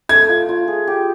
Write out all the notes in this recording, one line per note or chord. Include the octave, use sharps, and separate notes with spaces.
A3 G#6
F4
F4
G#4
G4